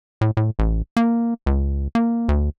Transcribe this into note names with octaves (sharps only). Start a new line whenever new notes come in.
A2
A2
A1
A#3
C#2
A#3
D2